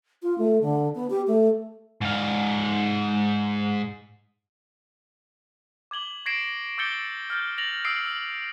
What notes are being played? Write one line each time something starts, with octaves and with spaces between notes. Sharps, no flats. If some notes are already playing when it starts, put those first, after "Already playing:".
F4
A3
D3
B3
G4
A3
G#2 F5
D6 G#6 F#7 G7
C#6 G#6 A#6 C7 D7 E7
D6 E6 G6 A6 C#7 G7
F6 G6 A6
A6 A#6 F7 F#7
D#6 E6 C7 D7